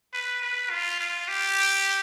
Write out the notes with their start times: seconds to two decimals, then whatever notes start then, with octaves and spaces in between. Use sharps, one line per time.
0.13 B4
0.42 B4
0.70 F4
1.00 F4
1.28 G4